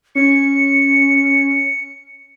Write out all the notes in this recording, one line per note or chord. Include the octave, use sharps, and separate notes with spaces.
C#4 C#7